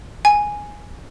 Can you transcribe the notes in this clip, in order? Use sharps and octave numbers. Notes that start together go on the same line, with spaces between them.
G#5